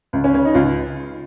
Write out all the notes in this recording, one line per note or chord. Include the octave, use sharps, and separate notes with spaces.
C#2
C#4
C#3 C#4
D#4
C#2 F4